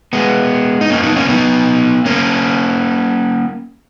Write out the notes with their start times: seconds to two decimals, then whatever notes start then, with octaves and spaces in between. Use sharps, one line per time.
0.13 G#3 B3
0.81 D#4
0.90 A#3 C#4
1.03 B3 D#4
1.16 A#3 C#4
1.29 B3 D#4
2.06 A#3 C#4